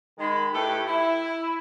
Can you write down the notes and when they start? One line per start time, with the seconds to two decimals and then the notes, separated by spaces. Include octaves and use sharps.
0.19 D#3 G#3 B5
0.53 A2 A3 G4 A4 B4
0.87 E4